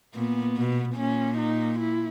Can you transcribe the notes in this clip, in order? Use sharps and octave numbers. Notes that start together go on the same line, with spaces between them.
A#2 B3
B2
A#2 C#4
D#4
E4